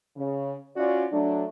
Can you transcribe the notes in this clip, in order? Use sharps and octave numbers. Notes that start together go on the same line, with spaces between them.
C#3
C#4 F4 F#4 D5
F#3 A3 D4